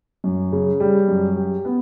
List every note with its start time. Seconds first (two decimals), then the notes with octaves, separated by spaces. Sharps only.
0.24 F#2
0.52 C#3
0.80 G3
1.08 F#2
1.37 G4
1.65 B3